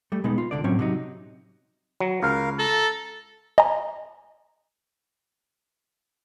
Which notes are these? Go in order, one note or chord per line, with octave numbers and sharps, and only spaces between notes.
G3 A3
B2 G#3 B3 D#4
F4
C2 D3 D5
A2 F#3 C4 C#4 C#5
C3 F#3 D#4
F#3
C#2 A#4 F5
A4 A#5
D#5 G#5 A#5